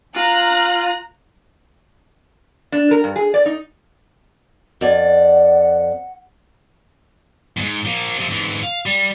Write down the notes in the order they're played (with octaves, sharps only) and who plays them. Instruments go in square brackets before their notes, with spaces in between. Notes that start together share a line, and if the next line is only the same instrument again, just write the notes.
[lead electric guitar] F4 [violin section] A#5 F#6
[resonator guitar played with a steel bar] D4
A#4
G2
G#4
D5
D#4
[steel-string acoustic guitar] F2 D5 [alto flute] F#5
[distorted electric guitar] E2 G#2
F3 A#3
C3 F3
G#2 E3
F5
G3